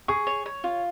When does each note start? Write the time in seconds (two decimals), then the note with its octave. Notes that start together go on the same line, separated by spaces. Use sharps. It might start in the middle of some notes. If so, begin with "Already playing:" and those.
0.08 G#4 C#6
0.27 C#5
0.46 C#5
0.64 F4